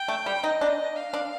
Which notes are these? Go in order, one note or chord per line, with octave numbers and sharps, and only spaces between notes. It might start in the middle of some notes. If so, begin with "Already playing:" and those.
Already playing: G5
A3
G3
D#4 D#5
D4
F5
D4